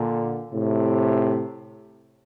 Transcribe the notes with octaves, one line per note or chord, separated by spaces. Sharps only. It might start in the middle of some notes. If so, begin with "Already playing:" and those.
Already playing: A#2 D3
A2 C3